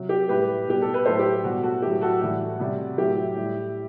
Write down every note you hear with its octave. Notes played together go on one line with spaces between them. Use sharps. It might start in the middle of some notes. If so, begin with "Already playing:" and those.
Already playing: C3 F#3
G4
A2 G3 G4 B4
B2 G3 G4
A4
B4
A2 F#3 A4 C5
G4
B2 G3 F#4
F#4 A4
A2 F#3 G4
F#4 A4
A2 E3 G3 F#4
C3 G3
A2 F#3 G4
A2 G3